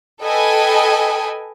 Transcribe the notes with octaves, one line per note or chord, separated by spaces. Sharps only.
A4 B4 D#5 G5 G#5